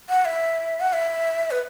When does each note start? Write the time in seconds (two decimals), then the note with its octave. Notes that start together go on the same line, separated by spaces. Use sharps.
0.09 F#5
0.25 E5
0.80 F#5
0.93 E5
1.51 B4